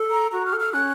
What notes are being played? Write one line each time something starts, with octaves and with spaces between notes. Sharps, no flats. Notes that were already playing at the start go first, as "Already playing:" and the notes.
Already playing: A4
A#5
F#4 A#5
F6
A4
F6
C#4 F#6